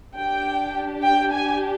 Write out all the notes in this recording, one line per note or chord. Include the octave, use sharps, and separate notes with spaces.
D4 G4 G5
G5
G#5